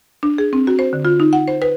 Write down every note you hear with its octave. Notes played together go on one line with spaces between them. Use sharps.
D4
G#4
C4
F#4
C5
D3
F4
D#4
F#5
C5
B4